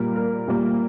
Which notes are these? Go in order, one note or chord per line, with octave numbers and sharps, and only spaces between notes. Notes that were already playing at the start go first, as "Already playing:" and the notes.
Already playing: A#2 G3 A#3 A#4
A#4
A#2 G3 A#3